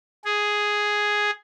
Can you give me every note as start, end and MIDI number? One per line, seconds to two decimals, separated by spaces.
0.25 1.30 68